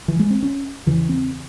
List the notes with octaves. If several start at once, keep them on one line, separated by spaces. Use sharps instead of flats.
E3
G#3
C4
C#4
E2 C#3 E3
C4